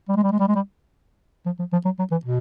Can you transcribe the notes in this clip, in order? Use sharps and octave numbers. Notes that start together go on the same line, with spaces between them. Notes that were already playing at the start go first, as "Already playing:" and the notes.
G3
G#3
G3
G#3
G3
G#3
G3
F3
F3
F3
F#3
F#3
E3
B2